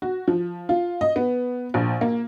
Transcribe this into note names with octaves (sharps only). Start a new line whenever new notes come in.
F#4
F3
F4
D#5
B3
A#1
A#3